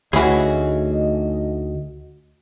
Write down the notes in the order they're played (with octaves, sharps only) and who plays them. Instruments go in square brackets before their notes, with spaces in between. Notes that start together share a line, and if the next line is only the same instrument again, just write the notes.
[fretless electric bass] D2 [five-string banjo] E3 C#4 [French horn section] A3 D#4 D#5 [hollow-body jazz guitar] F#4 G#4